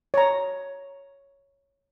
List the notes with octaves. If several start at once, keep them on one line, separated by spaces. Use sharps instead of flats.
C#5 A#5